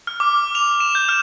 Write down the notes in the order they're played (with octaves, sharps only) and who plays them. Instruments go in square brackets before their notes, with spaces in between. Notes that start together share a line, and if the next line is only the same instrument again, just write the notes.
[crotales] F6
D6
F7
E7
G6
F6